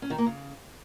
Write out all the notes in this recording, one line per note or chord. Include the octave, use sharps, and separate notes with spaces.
C#4
D#3
A#3
C#3